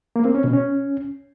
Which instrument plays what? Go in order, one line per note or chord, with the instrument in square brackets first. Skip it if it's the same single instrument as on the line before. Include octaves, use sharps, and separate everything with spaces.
[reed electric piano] A#3
C4
C#4
B2
C#4